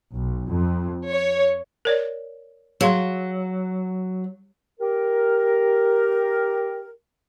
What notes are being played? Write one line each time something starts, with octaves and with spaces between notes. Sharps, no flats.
B1
F2
C#5
A#4 C#5 D5
F#3 G#4 F5 C6
G4 A#4